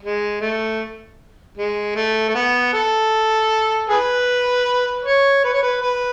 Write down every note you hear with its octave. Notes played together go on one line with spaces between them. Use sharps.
G#3
A3
G#3
A3
A3
B3
A4
G#4 B4
C#5
B4
C#5
B4
B4